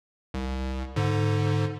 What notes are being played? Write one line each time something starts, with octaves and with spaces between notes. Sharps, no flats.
C2
G#2 D3